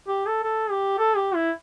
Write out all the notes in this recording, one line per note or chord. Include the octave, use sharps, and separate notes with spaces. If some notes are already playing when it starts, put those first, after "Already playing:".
G4
A4
A4
G4
A4
G4
E4